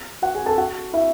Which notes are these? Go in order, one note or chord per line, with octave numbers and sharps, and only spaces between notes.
F#4 F#5
G#4 G#5
A4 A5
F#4 F#5
E4 E5